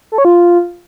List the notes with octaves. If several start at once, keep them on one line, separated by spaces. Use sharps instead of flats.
A4
C#5
F4